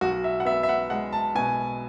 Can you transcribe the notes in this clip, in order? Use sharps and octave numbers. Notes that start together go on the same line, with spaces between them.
B1 F#4
E5
F#5
B3 E5
E5
F#5
G#3 F#5
A5
B2 G#5